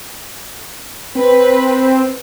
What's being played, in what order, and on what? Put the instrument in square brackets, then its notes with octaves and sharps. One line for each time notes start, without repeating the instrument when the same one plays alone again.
[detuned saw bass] C4 [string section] B4